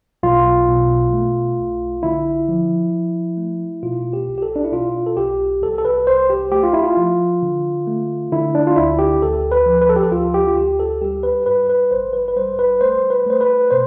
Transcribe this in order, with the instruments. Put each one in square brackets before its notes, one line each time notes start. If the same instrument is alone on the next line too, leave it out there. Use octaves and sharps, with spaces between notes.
[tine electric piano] B1 F4
B2
A3
B1
D3 E4
F3
F3
A3
B2 F4
G4
B1
G4
A4
D4
E4
B2 F4
A4
B1 G4
C2 A4
A4
B4
C2 C5
G4
A3 G4
F4
E4
F4
F3
D3
A3
D3 E4
D4
F4
D2 E4
G4
D2 A4
B4
F3
B4
A4
G4
A4
D2 F4
G4
F4
D2 G4
A4
G3 G4
B4
G2 B4
B4
A1 C5
B4
B4
G3 C5
B4
A3 C5
B4
A3 C5
B4
B2 C5